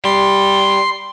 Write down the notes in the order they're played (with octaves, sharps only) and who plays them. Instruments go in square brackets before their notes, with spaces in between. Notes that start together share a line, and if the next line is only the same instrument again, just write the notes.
[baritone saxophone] G3 [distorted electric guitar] C6